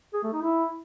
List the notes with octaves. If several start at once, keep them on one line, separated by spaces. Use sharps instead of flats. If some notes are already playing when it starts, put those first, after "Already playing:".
G#4
A3
D#4
E4